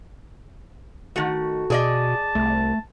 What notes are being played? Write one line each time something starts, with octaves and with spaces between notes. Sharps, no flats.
D#3 A3 F#4
B2 G#4 D5 D#5 A5
C2 A3